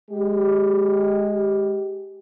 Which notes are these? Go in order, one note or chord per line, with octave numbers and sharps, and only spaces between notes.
G#3 G4